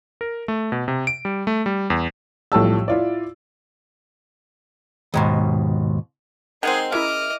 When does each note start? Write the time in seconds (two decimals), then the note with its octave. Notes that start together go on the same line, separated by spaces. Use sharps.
0.21 A#4
0.48 A3
0.72 B2
0.88 C3
1.07 D7
1.25 G3
1.47 A3
1.66 G3
1.90 E2
2.52 B1 A2 F3 G3 A5 E6
2.88 E4 F4 D5
5.14 D#2 G#2 B2
6.63 D#3 G#3 C4 D#4 G#4 F#5 C6
6.92 C#3 E4 A#4 D#5 E5 D6 F6